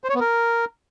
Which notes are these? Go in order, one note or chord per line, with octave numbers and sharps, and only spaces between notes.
C5
C#5
B3
A#4